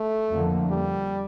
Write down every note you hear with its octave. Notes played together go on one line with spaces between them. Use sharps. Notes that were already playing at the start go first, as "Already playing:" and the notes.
Already playing: A3
F2 D3 F3 A#3
G3